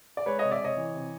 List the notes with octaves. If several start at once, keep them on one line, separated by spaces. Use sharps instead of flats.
D5
G#3 B4 C#5
C3 C#5 D#5
D5 E5
C3 C#5 D#5
E3
C3